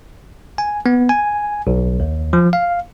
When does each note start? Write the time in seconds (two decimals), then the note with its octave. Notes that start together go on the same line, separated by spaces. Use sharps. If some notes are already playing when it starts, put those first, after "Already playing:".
0.58 G#5
0.86 B3
1.09 G#5
1.67 B1
2.00 D#2
2.33 F3
2.53 F5